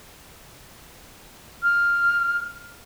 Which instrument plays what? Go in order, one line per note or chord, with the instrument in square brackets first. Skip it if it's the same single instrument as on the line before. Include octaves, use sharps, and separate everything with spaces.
[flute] F6